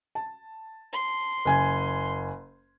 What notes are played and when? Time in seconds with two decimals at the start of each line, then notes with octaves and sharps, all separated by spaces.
0.15 A5
0.93 C6
1.45 F#1 G#5 G#6